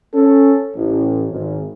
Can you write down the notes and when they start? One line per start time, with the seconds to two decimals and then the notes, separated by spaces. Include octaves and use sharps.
0.14 C#4 A4
0.76 A1 A2
1.30 G#1